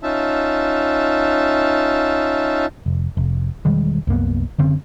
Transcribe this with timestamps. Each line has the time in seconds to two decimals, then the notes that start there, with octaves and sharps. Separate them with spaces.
0.03 C#4 D#4 F4 E5 A5
2.86 F1
3.17 F1
3.65 E1 D#3 G3 G#3
4.07 C2 F#2 A#3 B3
4.58 F#1 D3 C4 C#4